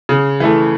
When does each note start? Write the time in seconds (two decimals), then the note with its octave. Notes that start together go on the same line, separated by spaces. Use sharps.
0.09 C#3
0.40 E3 A3